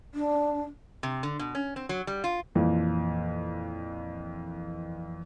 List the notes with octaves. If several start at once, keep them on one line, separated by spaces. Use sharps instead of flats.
D4
C3
D3
B2
C#4
C4
F#3
G3
F4
F2 A#2 E3